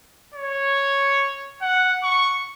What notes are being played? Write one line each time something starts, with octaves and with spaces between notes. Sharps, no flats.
C#5
F#5
C#6